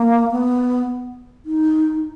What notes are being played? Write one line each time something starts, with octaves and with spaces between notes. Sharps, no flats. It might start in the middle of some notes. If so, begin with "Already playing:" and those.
Already playing: A#3
B3
D#4